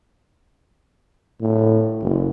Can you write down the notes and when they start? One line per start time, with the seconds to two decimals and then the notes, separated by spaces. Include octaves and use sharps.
1.41 A2
2.02 F#1